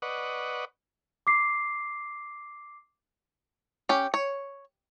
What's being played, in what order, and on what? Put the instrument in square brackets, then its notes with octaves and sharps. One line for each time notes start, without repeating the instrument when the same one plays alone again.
[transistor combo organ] B4 D5 D#5 F#5 C#6
[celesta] D6 C7
[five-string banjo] C#4 G4
C#5